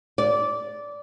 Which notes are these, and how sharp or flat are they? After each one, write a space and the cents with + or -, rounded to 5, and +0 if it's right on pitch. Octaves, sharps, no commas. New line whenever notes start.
D5 -15